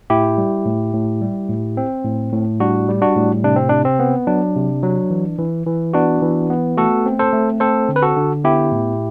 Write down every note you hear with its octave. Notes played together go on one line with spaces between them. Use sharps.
A2 E4 G4
G3
A2
A2
G3
A2
C4
A2
A2
G3 D4 F#4
G3
D4 F#4
A2
C3 D4
C4
C3 D4
C4
B3
F#3 D4
C3
F#3
E3
E3
E3
B3 D4 F#4
E3
B3
A3 F#4 A4
C4
A4 C5
A3
C4 A4 C5
D3
B4
F#4 A4
D3
B3 E4 G4
A2